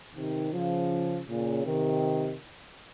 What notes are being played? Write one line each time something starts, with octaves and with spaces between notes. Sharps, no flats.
C3 D#3
C#3 F3
A#2 C#3
C3 D#3